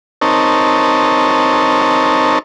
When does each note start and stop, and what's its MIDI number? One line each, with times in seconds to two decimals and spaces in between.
0.22 2.39 60
0.22 2.39 63
0.22 2.39 70
0.22 2.39 73
0.22 2.39 81